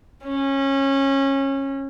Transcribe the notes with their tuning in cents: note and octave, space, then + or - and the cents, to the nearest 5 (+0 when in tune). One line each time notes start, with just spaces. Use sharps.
C#4 -20